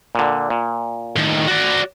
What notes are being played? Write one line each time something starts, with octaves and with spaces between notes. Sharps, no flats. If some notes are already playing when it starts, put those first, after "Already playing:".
A#2 D3
A#2
A2 D#3
F#4 D5